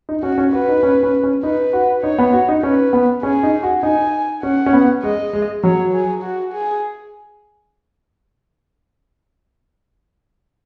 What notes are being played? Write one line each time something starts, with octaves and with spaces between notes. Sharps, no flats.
D#4
C#4 F#4
C#4
F#4 B4
D#4
C#4
C#4
C#4
D#4 B4
F#4
D#4 C#5
B3
F#4
D#4
C#4 B4
B3
C#4 G#4
D#4
F#4
D#4 G#5
C#4 F#5
C#4
B3
G#3 D#5
G#3
F#3 C#5
G#4
F#4
G#4